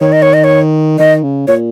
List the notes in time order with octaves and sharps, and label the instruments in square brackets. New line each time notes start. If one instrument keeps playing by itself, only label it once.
[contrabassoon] D#3 [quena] C#5
[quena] D#5
C#5
D#5
C#5
[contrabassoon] D#3 [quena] D#5
[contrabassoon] C#3
[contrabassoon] A#2 [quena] C#5